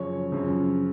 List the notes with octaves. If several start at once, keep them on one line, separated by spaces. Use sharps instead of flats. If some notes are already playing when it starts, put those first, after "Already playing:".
Already playing: F#2 C#3 F3 C#5
F#2 C#3 F3